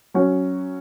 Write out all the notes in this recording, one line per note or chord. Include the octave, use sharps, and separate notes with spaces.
F#3 C#4 F#4